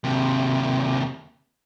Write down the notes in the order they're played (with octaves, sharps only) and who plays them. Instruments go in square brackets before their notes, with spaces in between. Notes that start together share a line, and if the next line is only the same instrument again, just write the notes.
[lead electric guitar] D#2 C3